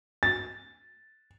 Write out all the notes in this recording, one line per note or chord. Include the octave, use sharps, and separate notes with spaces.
A6